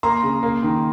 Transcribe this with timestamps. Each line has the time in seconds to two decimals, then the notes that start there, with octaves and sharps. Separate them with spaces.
0.03 A#3 A#5 C6
0.23 C#3
0.43 A#3
0.63 D#3